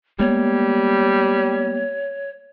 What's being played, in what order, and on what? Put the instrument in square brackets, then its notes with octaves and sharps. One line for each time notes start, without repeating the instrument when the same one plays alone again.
[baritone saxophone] G3 [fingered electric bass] G#3 A#3 B3 [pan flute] C#5